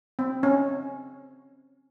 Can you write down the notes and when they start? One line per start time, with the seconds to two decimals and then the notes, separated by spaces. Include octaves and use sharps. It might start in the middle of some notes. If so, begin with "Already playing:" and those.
0.19 C4
0.43 C#4